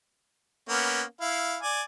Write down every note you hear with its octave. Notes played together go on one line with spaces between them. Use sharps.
A#3 B3 C#4
E4 F5
D5 G#5